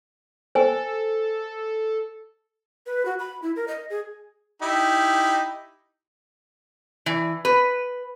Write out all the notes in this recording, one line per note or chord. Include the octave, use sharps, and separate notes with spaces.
A4 C5 G#5
B4
F#4
B5
E4
A#4
D#5
G#4
D#4 E4 G4
E3
B4